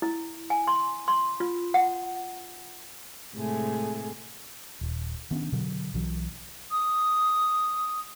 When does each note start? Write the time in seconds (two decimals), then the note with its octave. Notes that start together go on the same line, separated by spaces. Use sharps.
0.02 E4
0.50 G#5
0.67 C6
1.08 C6
1.40 F4
1.74 F#5
3.35 A2 C3 G#3 A3 G#4
4.81 D#1
5.31 D#3 B3 C#4 D4
5.52 B2 D3 F#3
5.94 B1 E3 F#3
6.71 D#6